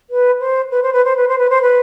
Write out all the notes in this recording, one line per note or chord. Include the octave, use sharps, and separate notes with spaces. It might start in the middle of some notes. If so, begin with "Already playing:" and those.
B4
C5
B4
C5
B4
C5
B4
C5
B4
C5
B4